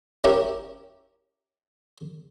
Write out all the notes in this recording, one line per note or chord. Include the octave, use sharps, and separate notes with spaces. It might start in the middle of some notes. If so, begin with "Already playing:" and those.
C#4 E4 G4 A#4